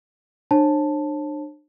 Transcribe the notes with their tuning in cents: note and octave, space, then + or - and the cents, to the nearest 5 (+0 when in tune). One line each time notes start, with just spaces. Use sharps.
D4 +35 C#5 -45 A5 +0